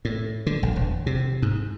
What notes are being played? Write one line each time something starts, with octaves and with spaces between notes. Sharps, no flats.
A2
D3
A#1
E1
C3
G#2